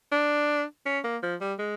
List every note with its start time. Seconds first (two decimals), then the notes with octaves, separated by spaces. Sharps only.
0.12 D4
0.86 C#4
1.04 A#3
1.23 F3
1.41 G3
1.59 G#3